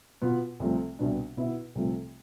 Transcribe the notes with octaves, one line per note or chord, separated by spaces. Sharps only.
B2 B3 F4
C2 C3 F3 A3
C2 B2 B3 D4
B2 B3 E4 B4 E5
C2 C3 F3 A3